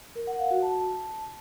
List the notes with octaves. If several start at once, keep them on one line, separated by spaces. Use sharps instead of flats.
A#4
F#5
F5
F#4
A5